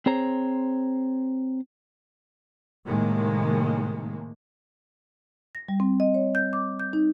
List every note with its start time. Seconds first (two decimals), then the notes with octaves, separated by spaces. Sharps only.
0.06 C4 G#4 C5 C#5 A#5
2.86 A2 C3 D#3 G#3 A#3
5.55 A#6
5.68 G3
5.80 C4
6.00 D#5
6.14 C#5
6.35 G6
6.53 D6
6.80 G6
6.93 D#4